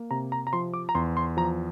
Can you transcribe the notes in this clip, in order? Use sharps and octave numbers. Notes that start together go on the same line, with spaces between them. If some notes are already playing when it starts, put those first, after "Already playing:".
Already playing: A#3
C3 A#5
A#5
A#5
F3 C6
D6
A#5
E2 C6
C6
F3 A#5